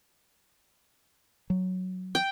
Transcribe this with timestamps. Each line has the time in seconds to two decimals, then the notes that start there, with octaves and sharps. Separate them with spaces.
1.50 F#3
2.15 G5